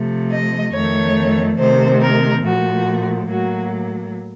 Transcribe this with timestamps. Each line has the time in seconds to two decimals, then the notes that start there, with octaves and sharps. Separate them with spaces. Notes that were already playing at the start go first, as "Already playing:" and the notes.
Already playing: C3 F3 A3
0.31 D#5
0.73 F2 D#3 A3 C#5
1.58 C3 D#3 A3 C5
2.01 A#4
2.43 A#2 F3 A3 F#4
3.28 A2 F#3 A#3 F#4